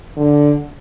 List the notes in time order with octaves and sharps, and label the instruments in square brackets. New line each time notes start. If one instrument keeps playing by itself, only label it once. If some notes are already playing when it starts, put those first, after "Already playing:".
[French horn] D3